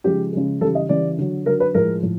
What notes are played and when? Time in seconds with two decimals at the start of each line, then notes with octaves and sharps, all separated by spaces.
0.04 C#3 F3 G#3 G4
0.33 C#3 F3 G#3
0.61 C#3 E3 G3 A4
0.75 D#5
0.89 C#3 E3 G3 D5
1.18 D3 F#3
1.45 D3 F#3 A#4
1.60 B4
1.74 A2 F3 G#3 A#4
2.03 A2 F3